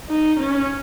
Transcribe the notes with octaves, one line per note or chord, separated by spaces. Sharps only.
D#4
C#4